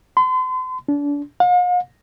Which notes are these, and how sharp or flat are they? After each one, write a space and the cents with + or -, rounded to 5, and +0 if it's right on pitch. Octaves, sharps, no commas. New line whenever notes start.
C6 -40
D4 -30
F5 +45